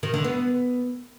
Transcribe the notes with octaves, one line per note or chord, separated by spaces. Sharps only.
D#3
D3
B3